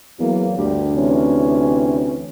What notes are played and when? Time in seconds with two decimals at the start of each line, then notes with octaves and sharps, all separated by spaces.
0.19 E2 F#3 A#3
0.58 D2 G2 G4
0.95 C3 E3 C#4